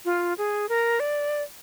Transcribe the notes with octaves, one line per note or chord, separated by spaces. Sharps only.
F4
G#4
A#4
D5